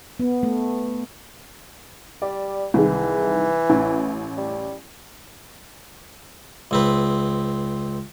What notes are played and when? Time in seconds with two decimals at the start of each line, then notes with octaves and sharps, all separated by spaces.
0.20 B3
0.43 A3
2.22 G3 D5
2.74 C2 D#3 E3 G#3
3.70 A1
4.38 G3
6.71 C#2 C4 B4